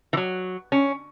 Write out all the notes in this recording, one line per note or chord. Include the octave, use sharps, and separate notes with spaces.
E3
F#3
C#4